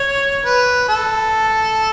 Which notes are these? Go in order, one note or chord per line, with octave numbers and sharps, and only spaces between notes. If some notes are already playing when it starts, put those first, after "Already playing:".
Already playing: C#5
B4
A4